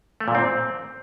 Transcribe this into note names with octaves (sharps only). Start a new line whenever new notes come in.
A3
A#2
C4